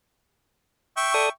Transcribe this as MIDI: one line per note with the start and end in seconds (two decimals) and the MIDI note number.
0.97 1.27 76
0.97 1.27 79
0.97 1.27 85
1.14 1.29 69
1.14 1.29 74
1.14 1.29 87